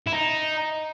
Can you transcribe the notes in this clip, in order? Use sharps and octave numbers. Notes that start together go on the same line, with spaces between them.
E4
D#4